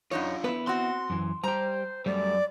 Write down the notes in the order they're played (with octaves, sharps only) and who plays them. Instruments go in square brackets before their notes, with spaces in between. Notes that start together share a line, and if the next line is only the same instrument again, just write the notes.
[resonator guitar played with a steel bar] F#2 D#4 C#5 [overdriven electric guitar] D4 F4
[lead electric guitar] B3 E4 [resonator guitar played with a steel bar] B4
[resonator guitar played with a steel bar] C4 F#4 [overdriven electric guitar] C6
[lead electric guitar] F#2 E3
[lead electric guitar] G3 G4 [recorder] C5 [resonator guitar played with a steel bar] A#5
[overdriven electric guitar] F#2 [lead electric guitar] G3 A3 [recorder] D5